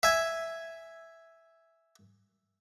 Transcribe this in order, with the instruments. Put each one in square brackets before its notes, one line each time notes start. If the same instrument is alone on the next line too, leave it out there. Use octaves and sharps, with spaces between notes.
[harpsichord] E5 G#5